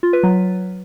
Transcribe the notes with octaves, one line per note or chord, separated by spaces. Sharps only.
F4
B4
F#3